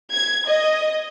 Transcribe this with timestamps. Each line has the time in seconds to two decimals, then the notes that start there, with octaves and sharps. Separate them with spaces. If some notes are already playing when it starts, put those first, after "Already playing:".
0.12 G#6
0.48 D#5